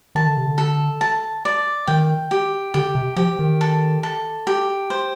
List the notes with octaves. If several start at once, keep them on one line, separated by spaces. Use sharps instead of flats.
D#3 A5
D3
C3
D3
A4
A5
D5
D#3 G5
G4
D3 G4
C3
F3 G4
D#3
A4
A4
G4
C5